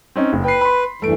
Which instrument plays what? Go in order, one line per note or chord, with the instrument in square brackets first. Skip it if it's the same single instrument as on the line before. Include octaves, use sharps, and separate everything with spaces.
[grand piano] C4 C#4 D#4
F#1
[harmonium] B4 [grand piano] G5 C7
[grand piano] B5 C6
[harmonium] E2 G2 E3 [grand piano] A3 D7